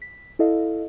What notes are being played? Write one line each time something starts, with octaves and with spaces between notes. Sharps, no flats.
B6
E4 A4 D#5 F5